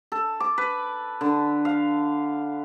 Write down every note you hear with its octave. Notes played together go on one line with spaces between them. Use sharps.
A4
D6
B4
D3
F5